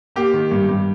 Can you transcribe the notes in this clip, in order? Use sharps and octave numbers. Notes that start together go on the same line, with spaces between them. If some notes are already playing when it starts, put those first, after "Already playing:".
A#3 G4
D#3
G2
G2